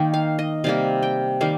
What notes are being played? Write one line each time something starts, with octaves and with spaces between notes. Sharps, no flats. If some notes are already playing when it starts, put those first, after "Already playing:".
Already playing: D#3 A#3 G5
F5
D#5
C3 G3 A#3 F5
G5
D#3 G3 A#3 F5